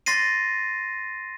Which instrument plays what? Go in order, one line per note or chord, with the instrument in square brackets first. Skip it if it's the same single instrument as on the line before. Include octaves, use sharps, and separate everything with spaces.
[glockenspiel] C6 A6 A#6 C7 D#7